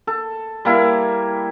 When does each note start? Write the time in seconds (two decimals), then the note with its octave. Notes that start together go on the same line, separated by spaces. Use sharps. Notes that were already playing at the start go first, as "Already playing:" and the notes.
0.07 A4
0.65 G3 A#3 E4